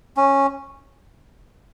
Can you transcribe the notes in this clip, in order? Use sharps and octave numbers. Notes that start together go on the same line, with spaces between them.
C#4